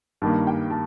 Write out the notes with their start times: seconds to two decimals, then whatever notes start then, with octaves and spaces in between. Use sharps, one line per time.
0.22 G2 D#3 G3 A#3 A5
0.47 G5
0.70 A5